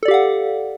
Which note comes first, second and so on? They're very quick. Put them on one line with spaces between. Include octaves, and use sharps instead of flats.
A4 D5 G4 F5 F#5